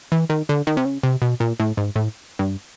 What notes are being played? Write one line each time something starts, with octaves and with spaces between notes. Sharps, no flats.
E3
D#3
D3
D#3
C3
C#3
C3
B2
A#2
A2
G#2
A2
G2